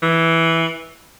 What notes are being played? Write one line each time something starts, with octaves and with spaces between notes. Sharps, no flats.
E3